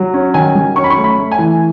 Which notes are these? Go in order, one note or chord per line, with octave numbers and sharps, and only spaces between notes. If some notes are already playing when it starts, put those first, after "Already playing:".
Already playing: F#3
C#4
D#3 G#5
F#3
C#4 C#6
B5
C#6
A3
B5
A3
G#5
E3